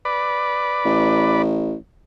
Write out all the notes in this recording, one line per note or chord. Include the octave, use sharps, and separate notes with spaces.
B4 D5
A1